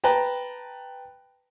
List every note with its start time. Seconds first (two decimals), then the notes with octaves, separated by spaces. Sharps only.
0.04 B4 G5 A5 A#5